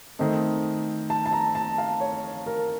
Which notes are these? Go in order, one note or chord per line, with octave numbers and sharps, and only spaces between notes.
D#3 A3 C4 D#4
A5
A5
A#5
A5
F5
C#5
A#4